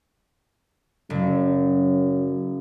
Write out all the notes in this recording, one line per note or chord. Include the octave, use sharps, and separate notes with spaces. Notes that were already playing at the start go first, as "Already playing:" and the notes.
F#1 F#2